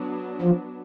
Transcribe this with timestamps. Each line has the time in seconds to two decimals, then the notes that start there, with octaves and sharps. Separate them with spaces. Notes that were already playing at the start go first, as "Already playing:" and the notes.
Already playing: F#3 B3 D4
0.42 F3